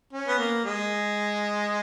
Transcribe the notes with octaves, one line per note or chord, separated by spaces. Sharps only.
C#4
B3
A#3
G#3